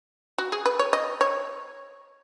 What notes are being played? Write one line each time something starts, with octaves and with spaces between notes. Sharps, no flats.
F#4
G#4
B4
C#5
D#5
C#5